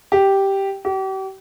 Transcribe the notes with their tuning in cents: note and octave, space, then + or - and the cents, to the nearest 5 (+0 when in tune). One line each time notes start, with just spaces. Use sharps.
G4 -5
G4 -40